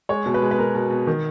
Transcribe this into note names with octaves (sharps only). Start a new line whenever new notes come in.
G#3 C#5
B2
B4
G#3
B4
B2 A#4
B2
B2
D#3